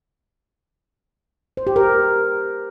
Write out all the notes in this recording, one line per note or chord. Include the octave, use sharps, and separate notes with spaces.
C5
G4
A#4